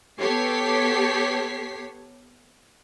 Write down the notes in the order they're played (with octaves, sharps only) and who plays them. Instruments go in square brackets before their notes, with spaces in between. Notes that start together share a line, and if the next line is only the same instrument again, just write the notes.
[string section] B3 G4 A4 C#5 B6 C7